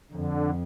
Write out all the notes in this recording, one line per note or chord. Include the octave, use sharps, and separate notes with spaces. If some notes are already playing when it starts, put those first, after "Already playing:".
F2 D3